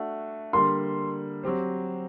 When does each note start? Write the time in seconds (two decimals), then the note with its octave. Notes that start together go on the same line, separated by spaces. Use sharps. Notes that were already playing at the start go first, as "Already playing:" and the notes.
Already playing: A3 D4 F#4
0.53 D3 G3 A#3 C6
1.43 F#3 C4 G4 C5